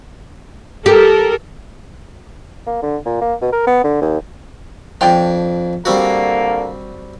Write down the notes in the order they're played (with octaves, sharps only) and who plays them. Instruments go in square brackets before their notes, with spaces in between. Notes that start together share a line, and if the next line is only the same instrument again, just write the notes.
[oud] G4 [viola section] A4 A#4
[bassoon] A#3
D3
A#2
A#3
B2
A#4
B3
D3
D#2
[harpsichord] F2 D4 [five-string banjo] F4 G5 A5
[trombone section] D3 A#3 [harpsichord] G3 C4 F#4